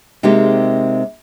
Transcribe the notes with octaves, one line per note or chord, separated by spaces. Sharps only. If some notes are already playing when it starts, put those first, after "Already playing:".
C3 G#3 A#3 C4 D#4 G4